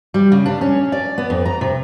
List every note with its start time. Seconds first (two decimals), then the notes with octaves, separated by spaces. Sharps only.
0.14 G3
0.32 C#3
0.46 D4
0.61 C#4
0.92 D5
1.18 B3
1.30 F2
1.45 A#5
1.61 C3